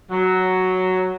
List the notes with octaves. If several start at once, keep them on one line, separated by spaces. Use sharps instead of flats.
F#3